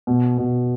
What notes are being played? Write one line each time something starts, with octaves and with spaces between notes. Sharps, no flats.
B2
B2